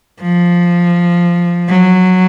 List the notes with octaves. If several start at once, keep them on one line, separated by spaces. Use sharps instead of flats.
F3
F#3